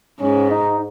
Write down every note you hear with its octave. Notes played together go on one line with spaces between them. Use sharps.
G#2 C#4
D#4